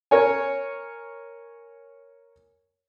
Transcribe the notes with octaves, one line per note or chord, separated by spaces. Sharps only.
A#4 C#5 G#5